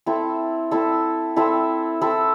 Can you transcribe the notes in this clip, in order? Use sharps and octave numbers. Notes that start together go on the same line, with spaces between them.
C4 E4 A4 E5
C4 E4 A4 E5
C4 E4 A4 E5
C4 E4 A4 E5